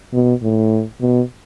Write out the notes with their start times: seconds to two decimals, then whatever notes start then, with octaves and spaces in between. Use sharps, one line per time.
0.13 B2
0.42 A2
1.01 B2